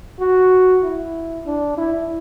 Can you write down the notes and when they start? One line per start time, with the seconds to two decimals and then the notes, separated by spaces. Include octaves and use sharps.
0.20 F#4
0.83 E4
1.46 D4
1.77 E4